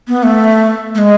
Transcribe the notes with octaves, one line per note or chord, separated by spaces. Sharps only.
B3
A3
A3
G#3